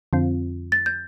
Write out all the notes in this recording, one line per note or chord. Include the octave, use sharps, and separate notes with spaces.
F2 D3 F3 C4 F4
A6
G6